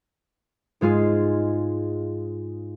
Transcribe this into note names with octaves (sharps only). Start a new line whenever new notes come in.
G#2 G#3 F4 G#4 C7